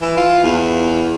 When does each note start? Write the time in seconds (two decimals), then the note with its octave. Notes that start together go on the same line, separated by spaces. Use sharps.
0.02 E3
0.17 F4
0.43 E2